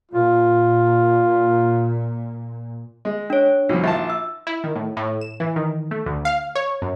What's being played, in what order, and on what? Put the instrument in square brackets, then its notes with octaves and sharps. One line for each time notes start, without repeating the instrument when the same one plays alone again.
[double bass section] A#2 [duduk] F4
[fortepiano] G#3
[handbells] D4 C#5
[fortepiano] C2 F2 [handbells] D#4 F#4
[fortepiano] A#1 F4 A5 [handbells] E5
[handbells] E6
[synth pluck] E4
D#3
A2
A2
E7
E3
D#3
A3
D2
F5
C#5
F#2